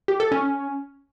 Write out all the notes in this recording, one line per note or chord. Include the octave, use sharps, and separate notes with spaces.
G4
A4
C#4